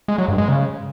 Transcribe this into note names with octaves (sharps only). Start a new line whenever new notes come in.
G#3
F#3
G2
G#3
C#3